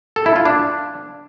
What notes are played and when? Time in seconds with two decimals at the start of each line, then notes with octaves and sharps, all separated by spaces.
0.16 A4
0.26 E4
0.36 F4
0.45 D4